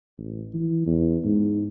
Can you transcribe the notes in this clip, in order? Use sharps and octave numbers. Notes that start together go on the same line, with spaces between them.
A1
E3
E2
G#2